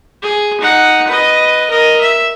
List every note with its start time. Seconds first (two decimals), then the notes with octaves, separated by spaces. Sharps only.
0.22 G#4
0.61 D#4 F#5
1.08 B4 D#5
1.70 A#4 D#5
2.01 E5